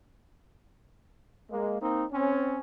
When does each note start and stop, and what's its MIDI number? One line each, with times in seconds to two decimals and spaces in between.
1.49 1.77 56
1.49 1.77 58
1.80 2.02 58
1.80 2.02 60
1.80 2.02 63
2.11 2.60 60
2.11 2.60 61